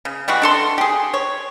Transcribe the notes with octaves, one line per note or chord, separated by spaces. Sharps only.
C#3
E3 G3 G#3 F#4
D4 A4 C6
G4 G#4
C#5